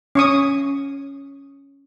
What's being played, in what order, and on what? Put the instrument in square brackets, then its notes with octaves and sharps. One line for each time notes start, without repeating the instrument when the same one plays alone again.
[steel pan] C#4 C#6 D#6